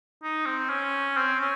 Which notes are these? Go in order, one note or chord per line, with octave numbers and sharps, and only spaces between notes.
D#4
C4
C#4
C4
C#4